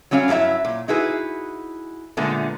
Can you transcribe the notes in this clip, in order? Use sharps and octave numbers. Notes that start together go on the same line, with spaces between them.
F#3 G3 C#4 C#5 F5
G2 F#3 G3 E4 E5
A#2
D#4 E4 F#4 G#4 B4
A#2 D3 G#3 A3 B3